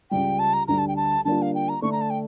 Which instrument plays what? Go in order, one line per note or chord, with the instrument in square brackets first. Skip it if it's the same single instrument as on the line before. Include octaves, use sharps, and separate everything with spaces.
[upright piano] C#2 C#3 G3 [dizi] G5
[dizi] A5
A#5
[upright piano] D2 D3 G3 [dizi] A#5
[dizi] A5
G5
A5
[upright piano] D3 G3 A#3 D4 F4 [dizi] A5
[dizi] F5
G5
A#5
[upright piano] D3 A3 D4 [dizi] C#6
[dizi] A#5
A5
G5